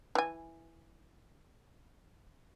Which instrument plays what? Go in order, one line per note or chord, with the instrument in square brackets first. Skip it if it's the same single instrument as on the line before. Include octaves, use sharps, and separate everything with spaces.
[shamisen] E3 G#5